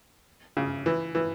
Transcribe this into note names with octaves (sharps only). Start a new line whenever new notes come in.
C#3
E3
E3